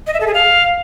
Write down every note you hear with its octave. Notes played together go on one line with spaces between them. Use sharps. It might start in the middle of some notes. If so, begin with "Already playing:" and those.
D#5
E5
A4
G#4
F5